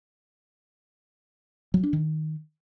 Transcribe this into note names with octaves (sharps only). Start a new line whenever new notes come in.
F#3
D4
D#3